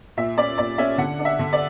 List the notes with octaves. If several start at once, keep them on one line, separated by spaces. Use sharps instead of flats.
A#2 E5
C#4 D5
A#2 D5
C#4 E5
D3 F#5
D4
E5
D3
D5